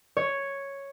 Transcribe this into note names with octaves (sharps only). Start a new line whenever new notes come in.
C#5